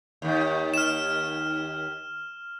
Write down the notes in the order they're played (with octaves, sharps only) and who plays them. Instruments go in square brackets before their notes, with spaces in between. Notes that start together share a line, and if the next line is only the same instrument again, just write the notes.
[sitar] D#2 D#3
[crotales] F6 E7